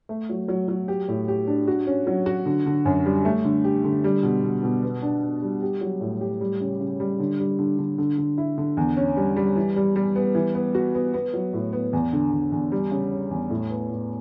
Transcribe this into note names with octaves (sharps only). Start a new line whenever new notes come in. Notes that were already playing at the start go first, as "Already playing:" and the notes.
A3
F#3
F#3
F#3
G4
A2
G4
D4
F#4
C#4
F#3
F#4
D3
D3
F#2
G3
A3
D3
G4
D3
G3
B2
B2
B2
B3
D4
B3
G3
G4
F#3
A2
G4
G3
C#3
C#3
G3
D3
G3
D3
D3
D3
D3
E4
D3
E2
C#4
G3
G3
E3
G3
G3
B3
E3
B3
F#4
B3
B3
F#3
A2
B3
E2
D3
E2
E2
G3
C#3
C#4
E2
A2
B3
A2